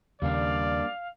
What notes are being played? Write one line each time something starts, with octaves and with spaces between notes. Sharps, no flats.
D#2 C#3 G3 A#3 D4 D5 F5